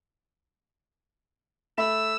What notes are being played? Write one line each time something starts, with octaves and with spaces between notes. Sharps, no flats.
A3 E5 B5 E6